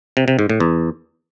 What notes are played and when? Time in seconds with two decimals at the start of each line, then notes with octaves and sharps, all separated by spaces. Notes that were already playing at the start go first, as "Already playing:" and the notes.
0.17 C3
0.28 C3
0.39 G#2
0.50 A2
0.60 E2